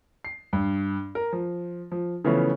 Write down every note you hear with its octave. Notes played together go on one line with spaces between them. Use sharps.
C7
G2
A#4
F3
F3
C#3 E3 F3 A3 B3 C#4